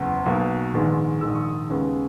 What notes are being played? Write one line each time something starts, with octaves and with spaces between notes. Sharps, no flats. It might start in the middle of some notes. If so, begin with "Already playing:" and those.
Already playing: F#1 E2
B1 B2 A#3
A#1 G#2 D#3 G#3 B3
A#1 G#2 D#3 E6
D#6
C#6
D#6
D#2 C#3 G#3 B3